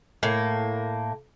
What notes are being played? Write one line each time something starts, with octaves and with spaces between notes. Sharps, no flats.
A2 A#3